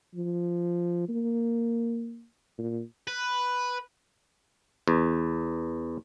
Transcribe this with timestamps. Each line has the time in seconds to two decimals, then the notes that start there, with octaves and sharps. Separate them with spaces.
0.15 F3
1.09 A#3
2.58 A#2
3.07 B4
4.88 E2